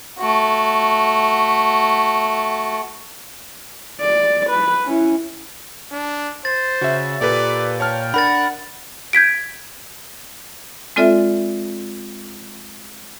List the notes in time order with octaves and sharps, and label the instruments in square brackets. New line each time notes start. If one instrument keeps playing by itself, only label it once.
[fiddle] A3 F#4
[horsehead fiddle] D5
B4
C#4 E4
[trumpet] D4
[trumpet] C5 [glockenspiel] A6
[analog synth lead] C#3 [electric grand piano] F#4 E5
[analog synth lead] A#2 [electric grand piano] G4 A4 B4 [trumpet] D5
[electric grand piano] C#5 A5 F6 [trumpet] G5
[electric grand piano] D4 A#4 [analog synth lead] F#5 [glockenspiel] B5 A6
[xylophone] G6 G#6 B6 D7
[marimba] G#3 C4 F4 A4 D5 E5